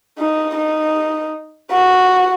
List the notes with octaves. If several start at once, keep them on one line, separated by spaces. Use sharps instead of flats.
D#4
D#4
F#4